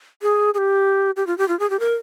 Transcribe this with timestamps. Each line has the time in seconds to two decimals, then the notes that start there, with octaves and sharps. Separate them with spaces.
0.22 G#4
0.54 G#4
0.58 G4
1.16 G4
1.27 F4
1.38 G4
1.48 F4
1.59 G#4
1.70 G4
1.80 A#4